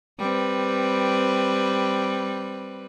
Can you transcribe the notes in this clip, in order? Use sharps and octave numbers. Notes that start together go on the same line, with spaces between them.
G3 C4 B4